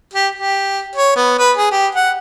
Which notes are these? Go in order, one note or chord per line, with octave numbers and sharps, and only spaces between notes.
G4
G4
C#5
B3
B4
G#4
G4
F#5